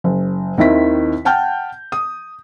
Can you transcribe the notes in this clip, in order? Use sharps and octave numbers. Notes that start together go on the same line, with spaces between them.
F#1
D#2 D#3 C4 E4 E5 B6
F#5 G5 A5 F6 G6
D#6